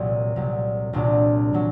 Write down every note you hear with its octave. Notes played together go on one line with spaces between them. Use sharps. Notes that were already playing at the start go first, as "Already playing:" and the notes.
Already playing: C2 A#2 F#3
C2 A#2 F#3
C2 A#2 F#3 D4
A#2 F#3